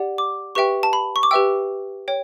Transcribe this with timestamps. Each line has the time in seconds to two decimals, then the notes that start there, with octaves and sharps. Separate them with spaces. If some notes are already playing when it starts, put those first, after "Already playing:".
Already playing: G4 D5 F#5
0.18 D6
0.55 G4 B4 E5 G5 C#6
0.83 A5
0.93 B5
1.16 C#6
1.23 D6
1.31 G4 B4 E5 G5 E6
2.08 C#5 G5